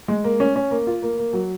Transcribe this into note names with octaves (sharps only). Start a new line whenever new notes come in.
G#3
A#3
C#4
C#4
A#3
F4
A#3
A#3
F#3